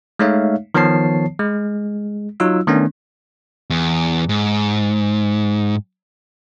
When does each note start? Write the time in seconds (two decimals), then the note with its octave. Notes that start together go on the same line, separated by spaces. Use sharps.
0.19 G#3 A3 D#4 C#5 E5 F5
0.74 D#3 F3 B3 C#5 A5 C7
1.39 G#3
2.40 F#3 D#4 F4 E6
2.67 D#3 A3 B3 C#4 D4
3.70 E2
4.29 G#2